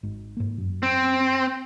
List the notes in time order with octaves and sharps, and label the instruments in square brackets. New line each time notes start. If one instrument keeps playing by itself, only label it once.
[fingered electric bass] G#1 G#2
G#2 A#3
F#2
[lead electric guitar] C4